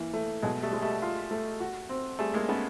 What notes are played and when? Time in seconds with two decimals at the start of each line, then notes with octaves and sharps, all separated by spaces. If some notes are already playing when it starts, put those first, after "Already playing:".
Already playing: E3 A#3
0.14 A3
0.42 B2 F#3 G#3
0.63 G3 A3
0.73 G#3
0.82 G3 A3
1.02 F4
1.31 A3
1.60 F#4
1.89 C4
2.19 G3 A3 G#4
2.34 G#3 A#3
2.48 A3 B3 C#4